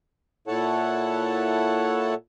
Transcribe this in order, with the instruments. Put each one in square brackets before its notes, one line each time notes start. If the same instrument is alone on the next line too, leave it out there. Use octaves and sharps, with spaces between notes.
[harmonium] A#2 E4 A4 C#5 F#5 A5